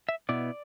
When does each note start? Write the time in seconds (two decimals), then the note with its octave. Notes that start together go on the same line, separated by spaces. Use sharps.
0.09 E5
0.29 B2 B3 E4 D5